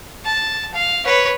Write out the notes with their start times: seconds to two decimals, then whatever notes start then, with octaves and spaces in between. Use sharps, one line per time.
0.25 A5
0.74 F5
1.05 B4 C#5